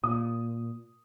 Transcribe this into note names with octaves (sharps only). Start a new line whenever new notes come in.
A#2 D#6